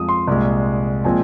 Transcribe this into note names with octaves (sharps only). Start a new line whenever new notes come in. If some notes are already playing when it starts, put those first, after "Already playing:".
Already playing: F2 F3 G#3 D#6
C6
C2 A#2 G#3
A#2 F3 G#3 C4 G#5